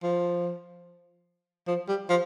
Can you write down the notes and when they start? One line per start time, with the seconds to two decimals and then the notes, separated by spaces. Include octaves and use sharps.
0.03 F3
1.68 F3
1.88 G3
2.10 F3